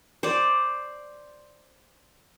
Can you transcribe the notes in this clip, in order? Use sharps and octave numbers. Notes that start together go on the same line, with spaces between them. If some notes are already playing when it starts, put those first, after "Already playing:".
C5 D5